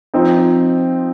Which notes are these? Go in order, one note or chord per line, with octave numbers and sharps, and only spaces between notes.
F3 C4 D#4